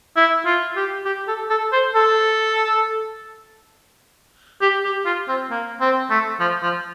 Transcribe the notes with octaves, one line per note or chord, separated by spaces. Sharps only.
E4
F4
G4
G4
A4
A4
C5
A4
G4
G4
F4
C4
A#3
C4
A3
F3
F3